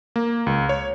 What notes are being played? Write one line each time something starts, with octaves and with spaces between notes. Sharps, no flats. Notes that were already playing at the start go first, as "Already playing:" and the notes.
A#3
C#2
C#5